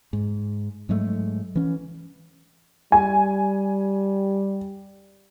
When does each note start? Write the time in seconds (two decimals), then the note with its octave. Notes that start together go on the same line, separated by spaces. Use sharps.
0.13 G#2
0.89 G#2 F#3 G#3 A3
1.55 E3 C#4
2.92 G3 G#5